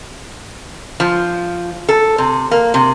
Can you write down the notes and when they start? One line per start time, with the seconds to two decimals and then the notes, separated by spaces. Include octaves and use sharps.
1.00 F3
1.89 A4
2.18 C3
2.51 A#3
2.74 C3